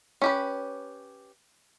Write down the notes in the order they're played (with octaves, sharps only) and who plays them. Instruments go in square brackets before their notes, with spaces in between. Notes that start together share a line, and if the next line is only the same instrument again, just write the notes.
[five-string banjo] C#4 G4 B4